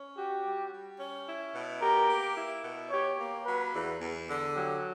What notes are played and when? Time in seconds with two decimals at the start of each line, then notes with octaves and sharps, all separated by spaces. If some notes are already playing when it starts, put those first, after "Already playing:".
Already playing: C#4
0.17 F#4 G4
0.45 G3
0.72 G3
0.99 C#4
1.27 E4
1.54 B2
1.81 G4 A#4
2.09 A#3
2.36 E4
2.63 B2
2.91 G4 C#5
3.18 A#3
3.45 F#3 B4
3.73 E2
4.00 E2
4.28 D3
4.55 F#3 G4